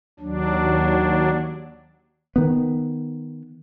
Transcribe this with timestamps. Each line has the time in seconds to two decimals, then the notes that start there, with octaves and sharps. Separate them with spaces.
0.20 D#2 F#3 D4
2.36 D#3 B3